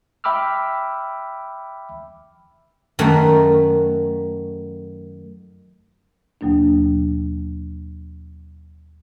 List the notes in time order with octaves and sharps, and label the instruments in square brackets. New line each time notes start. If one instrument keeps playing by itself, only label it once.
[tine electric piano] E5 G5 B5 D6 E6 F6
[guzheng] F#2 D#3 A3
[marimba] D#2 B2 F#3 A#3 D4